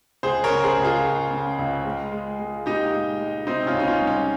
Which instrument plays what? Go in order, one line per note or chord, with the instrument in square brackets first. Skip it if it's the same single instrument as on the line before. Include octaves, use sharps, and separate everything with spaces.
[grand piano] C#2 G#4 C5
A#4 C#5
C#3
G#4 C5
C#2
F4 G#4
C#2
C#3
C#2
G#3
G#3
G#3
A#2 D#4 G4
G#3
G#3
C3 C4 D#4
C#4 F4
C#2
D#4
C#4 F4
G3
C#4